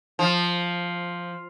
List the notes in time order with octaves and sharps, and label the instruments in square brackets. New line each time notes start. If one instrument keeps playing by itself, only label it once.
[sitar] F3